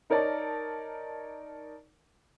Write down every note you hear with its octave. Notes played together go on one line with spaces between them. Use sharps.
D#4 A#4 C#5 D5 A5